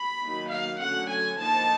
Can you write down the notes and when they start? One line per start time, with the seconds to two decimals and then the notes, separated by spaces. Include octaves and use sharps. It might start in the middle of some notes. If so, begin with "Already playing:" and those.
Already playing: B5
0.23 D#3 F#3 A#3 D#4
0.51 F5
0.81 D3 F#3 A3 C#4 F#5
1.10 G#5
1.40 F3 A#3 D#4 A5